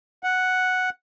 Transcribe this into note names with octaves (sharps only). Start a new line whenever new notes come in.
F#5